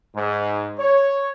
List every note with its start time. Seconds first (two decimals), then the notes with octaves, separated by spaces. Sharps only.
0.16 G#2
0.78 C#5